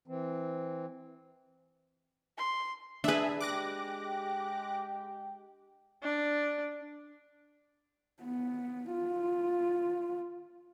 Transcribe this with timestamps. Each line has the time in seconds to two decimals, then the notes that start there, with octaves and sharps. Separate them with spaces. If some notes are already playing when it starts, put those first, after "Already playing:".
0.08 E3 C4
2.37 C6
3.04 D4 G#4 B4 E5
3.41 G#3 G4 G5 D6 F#6 A#6
6.03 D4
8.23 B3
8.92 F4